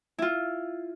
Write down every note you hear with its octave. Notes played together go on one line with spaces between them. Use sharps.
E4 F4